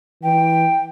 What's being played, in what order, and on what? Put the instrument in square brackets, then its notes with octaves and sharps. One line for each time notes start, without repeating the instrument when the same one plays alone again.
[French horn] E3 [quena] G5